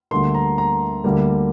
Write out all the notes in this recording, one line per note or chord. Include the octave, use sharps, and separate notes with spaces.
D2 D3 G3 A#3 C6
A#5
A#5
D2 D3 G3 A#3